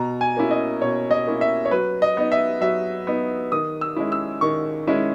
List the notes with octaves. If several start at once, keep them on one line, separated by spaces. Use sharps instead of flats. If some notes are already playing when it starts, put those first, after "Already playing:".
Already playing: B2 A#5
G#5
A#3 C#4 E4
D#5
B2 C#5
D#5
A#3 C#4 E4
E5
C#5
F#3 B4
D#5
B3 D#4
E5
F#3 E5
B3 D#4
D#3 D#6
E6
G#3 C#4 E4
E6
D#3 C#6
G#3 C#4 E4